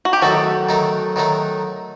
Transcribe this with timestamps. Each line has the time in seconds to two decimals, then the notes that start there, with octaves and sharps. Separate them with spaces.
0.05 F#4
0.13 G4
0.22 D#3 F#3 A3 D#4 F#4 A4
0.69 D#3 F#3 A3 D#4
1.16 D#3 F#3 A3 D#4